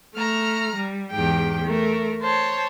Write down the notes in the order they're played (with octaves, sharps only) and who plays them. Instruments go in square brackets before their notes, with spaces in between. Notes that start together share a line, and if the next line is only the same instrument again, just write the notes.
[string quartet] A3 A#5 F6
G3
E2 G#2 G4 G5
A3 A#4
C5 C#5 A5